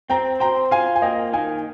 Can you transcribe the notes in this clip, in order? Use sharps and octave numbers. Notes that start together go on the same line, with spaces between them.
C4 G5 A#5
C5 G5 A#5
F4 F5 G#5
G#5
A#3 D#5 G5
D#3 F5 G#5